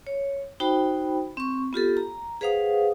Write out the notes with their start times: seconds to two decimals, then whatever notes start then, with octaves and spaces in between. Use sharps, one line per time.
0.07 C#5
0.60 D#4 F#4 C5 G5 B5
1.37 C4 C#6
1.73 B3 F4 G4 A4
1.97 A#5
2.41 G#4 B4 C5 F5 F#5 D#6